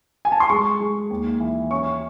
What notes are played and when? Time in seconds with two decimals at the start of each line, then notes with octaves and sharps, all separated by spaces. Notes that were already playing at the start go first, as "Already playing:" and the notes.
0.25 G#5
0.32 A5
0.40 C6
0.50 G#3 C#6
0.80 G#3
1.10 D#2
1.40 E3
1.71 C#4 C#6